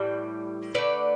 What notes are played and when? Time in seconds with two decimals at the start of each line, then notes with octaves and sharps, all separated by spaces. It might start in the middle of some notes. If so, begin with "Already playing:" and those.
Already playing: A2 E3 G3
0.74 D3 A3 B4 D5